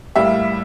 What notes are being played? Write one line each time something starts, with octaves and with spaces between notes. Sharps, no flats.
A2 G3 A#3 E5